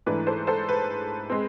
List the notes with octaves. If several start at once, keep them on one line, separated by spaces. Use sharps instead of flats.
G#2 E3 A3 D4 B4
A4 C5
A4 C5
B4
G#3 C4